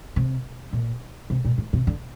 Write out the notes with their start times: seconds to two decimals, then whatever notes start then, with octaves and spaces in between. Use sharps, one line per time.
0.16 C3
0.73 A#2
1.30 C3
1.45 A#2
1.58 A2
1.73 C3
1.87 D3